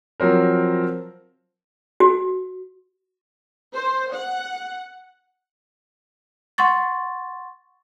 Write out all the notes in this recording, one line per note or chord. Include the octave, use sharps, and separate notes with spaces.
F3 F#3 C4 A#4
F#4
C5
F#5
F#5 C6 C#6 A6